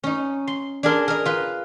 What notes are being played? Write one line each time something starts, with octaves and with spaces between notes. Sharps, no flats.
C#4 D#4
C6
D4 G#4 A#4 C6
A#4 D#5
F4 B4